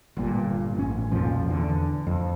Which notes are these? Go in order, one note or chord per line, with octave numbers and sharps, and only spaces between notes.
G1 G2 A#2
A1 C#4
B1 F2 A#2 F3
E2 D3
F2